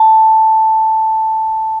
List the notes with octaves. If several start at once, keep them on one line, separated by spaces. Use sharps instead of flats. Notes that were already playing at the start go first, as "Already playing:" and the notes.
Already playing: A5